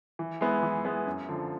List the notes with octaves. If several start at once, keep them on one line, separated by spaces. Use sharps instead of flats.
E3
G#3 B3 E4
E3
G#3 B3 E4
F#2
D3 F3